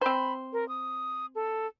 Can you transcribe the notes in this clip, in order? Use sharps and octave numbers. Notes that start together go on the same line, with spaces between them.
C4 C5 B5
A#4
D#6
A4